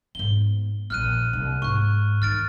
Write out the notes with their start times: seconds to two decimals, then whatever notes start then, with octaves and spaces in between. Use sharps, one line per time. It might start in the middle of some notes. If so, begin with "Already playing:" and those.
0.15 G#2 B3 G7
0.90 A#1 E2 F6 F#6 D#7
1.33 C2
1.62 G#2 C#6 F#6
2.22 D#3 F6 A6 D7